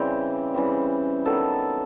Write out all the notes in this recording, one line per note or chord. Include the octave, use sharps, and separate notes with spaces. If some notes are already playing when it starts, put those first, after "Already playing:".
Already playing: C#3 E3 G3 C4 G4
C#3 E3 G3 C4
D#3 F#3 B3 A4